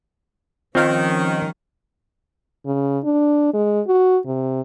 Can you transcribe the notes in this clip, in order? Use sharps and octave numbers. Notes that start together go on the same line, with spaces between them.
D#3 F3 G3 C4 C#4 F4 C#5 F5
C#3
D4
G#3
F#4
C3